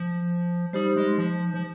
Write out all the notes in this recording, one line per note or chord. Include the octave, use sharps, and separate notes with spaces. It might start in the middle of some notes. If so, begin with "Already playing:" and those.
Already playing: F3
G3 D#4 G4 C5
G#3
F3
F3